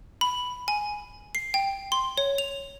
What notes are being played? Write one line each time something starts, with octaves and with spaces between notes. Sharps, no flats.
B5
G#5
C7
G5
C6
C#5
F7